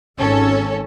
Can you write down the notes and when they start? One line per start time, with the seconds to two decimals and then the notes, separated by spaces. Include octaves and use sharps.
0.19 G#1 C#4 A4